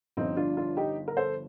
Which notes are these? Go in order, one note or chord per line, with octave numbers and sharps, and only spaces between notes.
G1 G2 D3 F3 C4 D#4
D4 F4
D4 F4
D#4 G4
A#4
A4 C5